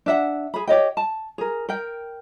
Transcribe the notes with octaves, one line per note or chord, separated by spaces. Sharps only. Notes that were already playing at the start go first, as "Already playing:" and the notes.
D4 E5 F#5
G#4 B5
G4 C#5 D#5 G5
A5
G#4 A#4
A#4 G5